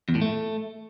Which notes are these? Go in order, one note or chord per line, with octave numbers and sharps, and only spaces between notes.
E2
A2
A3